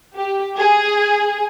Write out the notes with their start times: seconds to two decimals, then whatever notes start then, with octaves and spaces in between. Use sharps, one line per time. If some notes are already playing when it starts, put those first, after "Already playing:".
0.16 G4
0.57 G#4